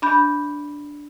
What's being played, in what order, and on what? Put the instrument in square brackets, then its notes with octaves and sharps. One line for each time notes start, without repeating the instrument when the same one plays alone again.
[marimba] D4 B5 G6